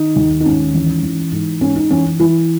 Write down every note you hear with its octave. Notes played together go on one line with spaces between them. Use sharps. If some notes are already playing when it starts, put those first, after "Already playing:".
Already playing: D#3 D#4
D#2
D#4
G#2 C#4
E3
E3
G#2
G#2 C#4
D#4
E3 C#4
E3 E4